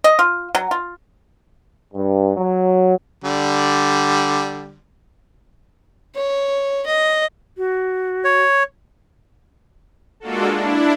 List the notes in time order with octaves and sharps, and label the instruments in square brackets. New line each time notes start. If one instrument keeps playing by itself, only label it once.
[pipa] D#5
F4
F#3
F4
[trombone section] G2
F#3
[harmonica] D3 G3
[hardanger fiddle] C#5
D#5
[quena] F#4
[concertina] C#5
[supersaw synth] G#3 A#3 D4 F4 F#4 A4
D4 E4